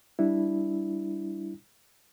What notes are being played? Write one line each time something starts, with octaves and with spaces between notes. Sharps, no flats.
G3 D4 E4